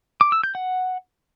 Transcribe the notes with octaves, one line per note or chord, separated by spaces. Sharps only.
D6
E6
G6
F#5